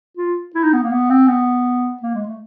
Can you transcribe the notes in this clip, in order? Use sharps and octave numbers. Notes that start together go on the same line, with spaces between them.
F4
E4
D#4
B3
A#3
B3
C4
B3
A#3
G#3
A3